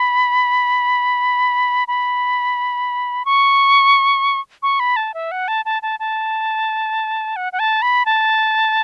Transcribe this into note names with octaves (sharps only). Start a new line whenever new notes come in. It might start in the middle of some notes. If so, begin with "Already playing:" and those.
Already playing: B5
B5
C#6
C#6
B5
A5
E5
F#5
A5
A5
A5
A5
F#5
F#5
A5
B5
A5